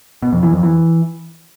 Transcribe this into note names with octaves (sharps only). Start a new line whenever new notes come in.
B2
F2
E3
F2
E3